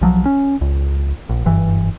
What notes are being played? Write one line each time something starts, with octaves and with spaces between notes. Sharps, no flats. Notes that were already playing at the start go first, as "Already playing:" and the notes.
B1 F3 F#3
C#4
C#2
A#1
F#1 G2 E3